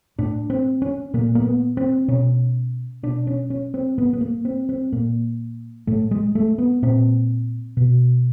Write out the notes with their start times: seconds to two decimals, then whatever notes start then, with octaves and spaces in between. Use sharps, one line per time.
0.19 A2 D4
0.50 C4
0.82 C#4
1.14 A#2 A#3
1.35 A#3
1.45 B3
1.77 C4
2.08 B2 C#4
3.03 B2 D4
3.27 C#4
3.50 C#4
3.74 C4
3.98 A2 B3
4.13 B3
4.21 A#3
4.45 C4
4.69 C4
4.92 A#2 A#3
5.87 A2 A3
6.11 G#3
6.35 A3
6.58 B3
6.82 A#2 C4
7.77 B2